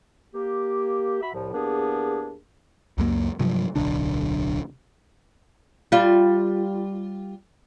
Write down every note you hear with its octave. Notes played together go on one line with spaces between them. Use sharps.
A#3 G4
F#4 E5 B5
C2 A2 F3
E2 A#3 B3 D4 G4 G#4
C#2 F#2 A#3
G2 C3 F3 F#3
D1 B1 D3 D4
G3 F4